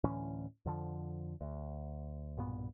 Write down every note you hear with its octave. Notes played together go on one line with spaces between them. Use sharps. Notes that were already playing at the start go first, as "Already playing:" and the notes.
D2 A2 E3 C#4
F2 D3 F3
D2
B1 G2 A#2 B3